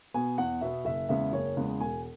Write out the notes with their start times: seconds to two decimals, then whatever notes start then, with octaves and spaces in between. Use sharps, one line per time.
0.14 B2 B3 G#5
0.38 E2 F#5
0.61 B2 B3 E5
0.85 F#1 E5
1.09 E2 C#3 G#3 B3 E5
1.33 F#1 C#5
1.57 E2 C#3 G#3 B3
1.80 E1 G#5